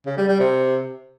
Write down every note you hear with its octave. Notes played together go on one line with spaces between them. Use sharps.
C#3
G3
G3
C3